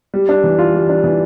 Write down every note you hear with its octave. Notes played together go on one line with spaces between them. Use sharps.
G3
D4
E3
F4
G3
D4
E3